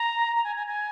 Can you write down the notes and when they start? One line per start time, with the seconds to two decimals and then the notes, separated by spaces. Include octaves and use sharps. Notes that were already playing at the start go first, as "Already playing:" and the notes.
Already playing: A#5
0.36 A#5
0.44 G#5
0.56 G#5
0.67 G#5